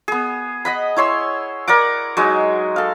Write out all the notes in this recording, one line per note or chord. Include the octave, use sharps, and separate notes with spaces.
B3 G#4
D#5 F#5 B5
E4 C#5 C6 E6
A#4 D5 F#5 D6
F#3 G#3 D#4
A4 F5